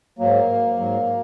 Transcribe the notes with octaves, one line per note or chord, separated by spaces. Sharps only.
G#2 F#3 A#3
G#2 F#3